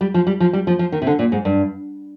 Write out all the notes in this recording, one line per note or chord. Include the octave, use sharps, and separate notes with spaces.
G3
F3
G3
F3
G3
F3
F3
D#3
C3
D3
A#2
G#2
G2